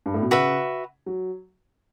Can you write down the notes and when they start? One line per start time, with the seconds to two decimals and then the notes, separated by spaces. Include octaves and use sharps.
0.06 G2
0.14 A2
0.22 B2
0.31 C#3 F#4 B4 E5
1.06 F#3